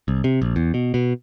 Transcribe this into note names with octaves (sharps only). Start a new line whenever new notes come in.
C2
C3
A#1
E2
B2
B2